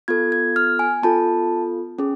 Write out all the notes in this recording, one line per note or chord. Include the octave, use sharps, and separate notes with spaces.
B3 F4 A4 G#6
G#6
F6
G#5
B3 F4 A4 A5
C#4 G#4